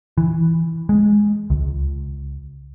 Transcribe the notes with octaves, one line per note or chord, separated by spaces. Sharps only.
E3
G#3
C#2